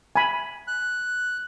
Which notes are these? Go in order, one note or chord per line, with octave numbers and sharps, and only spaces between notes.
G#5 B5
F#6